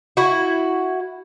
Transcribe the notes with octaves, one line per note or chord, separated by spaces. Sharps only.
E4 F#4